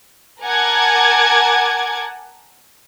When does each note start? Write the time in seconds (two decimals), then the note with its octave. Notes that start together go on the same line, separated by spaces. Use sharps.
0.44 A#4 F#5 G#5 A5 D6 G#6